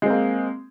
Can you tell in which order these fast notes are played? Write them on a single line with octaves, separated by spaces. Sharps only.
G#3 C4 A#3